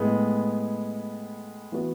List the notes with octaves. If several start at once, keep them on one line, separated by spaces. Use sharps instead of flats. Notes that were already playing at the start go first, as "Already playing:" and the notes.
Already playing: A2 G#3 B3
E3 B3 F#4